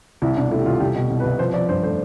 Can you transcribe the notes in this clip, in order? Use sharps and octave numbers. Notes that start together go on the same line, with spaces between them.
C2 E4
B2 D4
A3 E4
G4
C2 F4
C2 G4
B2 G4
C2
B4
C2
F3 C5
F3 D5
G2 C5
A3 C5